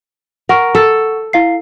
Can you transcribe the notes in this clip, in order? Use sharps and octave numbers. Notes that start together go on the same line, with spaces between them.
A#4 F#5 C#6
A4
E4 F5 C7